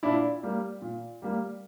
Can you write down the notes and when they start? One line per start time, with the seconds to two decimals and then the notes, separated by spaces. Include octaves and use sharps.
0.03 A#2 D4 E4
0.43 G3 A#3
0.82 A#2
1.22 G3 A#3